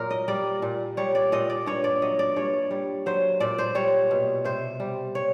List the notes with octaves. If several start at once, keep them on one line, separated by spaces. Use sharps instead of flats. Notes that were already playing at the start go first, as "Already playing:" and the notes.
Already playing: A#2 F#3 A#4
D#5
G3 D5
A#2
G3 C#5
D5
A#2 D#5
D5
G2 C#5
D5
F#3 D#5
D5
G2 C#5
G3
F#3 C5
A#2 D5
C5
G3 C#5
B2
C3 C5
G3
C#5